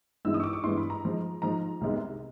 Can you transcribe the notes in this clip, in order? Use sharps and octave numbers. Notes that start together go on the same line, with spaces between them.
G2 E3 G#3 B3 E4 E6
D#6
C#6
D6
C#6
G2 E3 G#3 B3 E4 C6
B5
A#5
G#2 F3 G#3
G#2 F3 G#3 A#5
C2 C3 D#3 G#3 B3